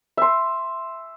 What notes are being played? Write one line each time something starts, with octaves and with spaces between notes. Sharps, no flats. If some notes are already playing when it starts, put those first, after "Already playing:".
E5 C6